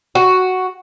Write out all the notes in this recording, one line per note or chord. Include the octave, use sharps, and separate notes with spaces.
F#4